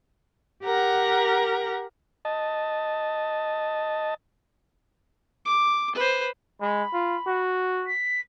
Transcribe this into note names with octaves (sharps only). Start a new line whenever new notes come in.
G4 A#4 F#5 A#5
D#5 A5
D6
B4 C5
G#3 B5
F4
F#4
B6